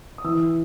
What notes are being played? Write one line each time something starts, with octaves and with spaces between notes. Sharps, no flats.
D#6
E3 E6